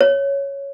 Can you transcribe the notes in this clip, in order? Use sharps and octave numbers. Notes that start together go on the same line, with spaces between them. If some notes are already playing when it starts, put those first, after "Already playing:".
C#5